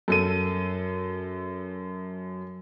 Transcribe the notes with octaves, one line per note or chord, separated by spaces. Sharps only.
F#2 A4 D#7